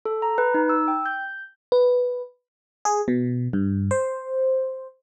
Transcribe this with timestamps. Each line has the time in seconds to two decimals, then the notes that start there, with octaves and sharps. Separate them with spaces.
0.05 A4
0.22 A#5
0.38 B4
0.54 D#4
0.69 E6
0.88 G5
1.06 G6
1.72 B4
2.85 G#4
3.08 B2
3.53 G2
3.91 C5